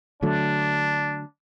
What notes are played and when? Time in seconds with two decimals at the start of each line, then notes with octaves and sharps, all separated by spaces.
0.22 D3 F#3 A3 D4